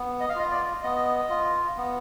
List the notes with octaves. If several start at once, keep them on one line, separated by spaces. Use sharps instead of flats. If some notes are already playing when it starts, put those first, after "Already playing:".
Already playing: B3
D#5
F5
F4 D#5
D5
B3 D#5
F4
B3